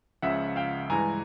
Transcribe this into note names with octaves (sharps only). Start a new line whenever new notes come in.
C#2 C#3 F3 E5 F#5
F5 G5
G2 E3 G#3 G#5 A#5